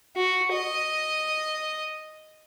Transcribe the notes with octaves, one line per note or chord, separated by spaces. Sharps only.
F#4
D#5